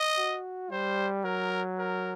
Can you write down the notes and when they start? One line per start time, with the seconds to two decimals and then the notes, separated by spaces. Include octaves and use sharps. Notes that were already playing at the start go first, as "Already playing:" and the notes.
Already playing: D#5
0.17 F#4
0.71 G3 C5
1.24 F#3 A#4
1.78 A#4